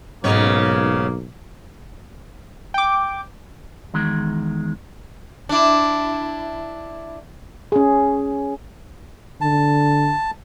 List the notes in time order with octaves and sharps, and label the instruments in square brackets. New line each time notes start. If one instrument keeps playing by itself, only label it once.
[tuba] B1 [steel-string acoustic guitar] G#2 [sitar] C#3 B3 C#5 [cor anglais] A#3
[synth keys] G5 D6
[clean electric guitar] E2 D#3 G#3
[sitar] D4 E4
[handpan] C#4 G#4
[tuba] D3 [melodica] A5